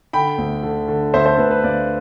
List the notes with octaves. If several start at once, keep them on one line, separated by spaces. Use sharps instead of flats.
D3 G5 B5
D2
D3
D3
D2 C5 E5
A4 C5
D2 B4
B4
D2 D5 F5